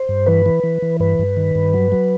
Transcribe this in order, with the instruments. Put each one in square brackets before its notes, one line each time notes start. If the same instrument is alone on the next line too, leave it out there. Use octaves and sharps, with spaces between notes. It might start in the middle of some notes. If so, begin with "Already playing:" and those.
Already playing: [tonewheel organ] C5
G2
E3 B4
E3
E3
E3
G2 B4
G2
D#3
G2
F#3
F#3